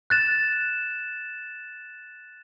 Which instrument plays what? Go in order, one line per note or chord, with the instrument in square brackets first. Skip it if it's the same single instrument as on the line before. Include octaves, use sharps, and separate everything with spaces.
[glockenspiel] F#6 A6 E7